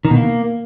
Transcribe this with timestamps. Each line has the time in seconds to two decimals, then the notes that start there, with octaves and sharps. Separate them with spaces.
0.05 D#3
0.11 B2
0.17 A#3